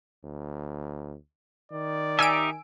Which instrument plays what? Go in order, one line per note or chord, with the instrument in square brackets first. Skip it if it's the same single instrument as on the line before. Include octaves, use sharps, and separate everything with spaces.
[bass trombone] D2
[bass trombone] D#3 [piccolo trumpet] D5
[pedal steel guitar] D#4 G4 E5 [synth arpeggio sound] G#5 E6 D7